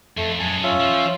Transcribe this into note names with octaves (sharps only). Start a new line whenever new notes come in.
F2 A3
F#2 G#3 G#5 A5
C#4 F4 E5
F3